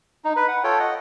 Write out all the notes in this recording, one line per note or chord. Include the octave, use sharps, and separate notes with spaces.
D#4
B4
F#5
F4 A4 C#5 G5
D#5 F#5